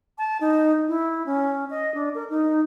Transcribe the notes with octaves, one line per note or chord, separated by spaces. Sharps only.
A5
D#4
E4
C#4
D#5
D4
A#4
D#4